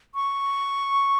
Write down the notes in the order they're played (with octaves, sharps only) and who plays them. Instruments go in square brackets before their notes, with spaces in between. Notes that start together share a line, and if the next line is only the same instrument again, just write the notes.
[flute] C#6